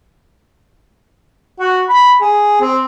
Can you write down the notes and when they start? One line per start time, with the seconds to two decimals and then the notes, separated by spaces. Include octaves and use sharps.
1.60 F#4
1.89 B5
2.22 G#4
2.61 C4